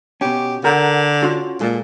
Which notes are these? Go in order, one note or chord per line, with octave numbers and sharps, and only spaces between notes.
B2 C#4 G4
D3 A#4 F#5 A#5
C#4 F4 F#4
A#2 G#3 A4